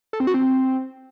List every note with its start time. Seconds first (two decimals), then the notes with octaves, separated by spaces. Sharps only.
0.13 A4
0.20 C4
0.27 F#4
0.34 C4